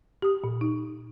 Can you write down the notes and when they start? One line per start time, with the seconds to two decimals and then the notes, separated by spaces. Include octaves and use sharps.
0.22 G4 D#6
0.44 A#2
0.61 D#4